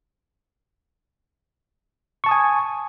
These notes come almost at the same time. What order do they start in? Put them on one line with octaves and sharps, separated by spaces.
C#6 A5 D#6 G#5